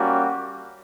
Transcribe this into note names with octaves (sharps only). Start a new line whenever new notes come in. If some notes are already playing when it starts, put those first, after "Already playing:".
Already playing: G3 A#3 C#4 F#4